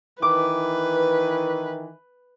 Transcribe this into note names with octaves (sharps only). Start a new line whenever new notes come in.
D#3 E3 B4 D6